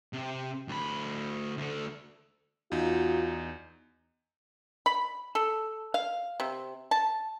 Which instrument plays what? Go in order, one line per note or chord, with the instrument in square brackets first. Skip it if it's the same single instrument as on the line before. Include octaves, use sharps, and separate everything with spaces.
[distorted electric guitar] C3
D2 B5
D2 D3
[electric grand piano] E2 D#4 [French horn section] F4 F#4
[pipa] B5
A4
F5
C3
A5